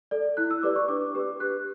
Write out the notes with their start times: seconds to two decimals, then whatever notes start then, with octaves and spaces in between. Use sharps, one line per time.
0.11 A4 D5
0.37 E4 F#6
0.51 E6
0.63 G4 B4 D5 D6
0.76 C#6
0.88 D4 D6
1.15 G4 B4
1.40 G4 F#6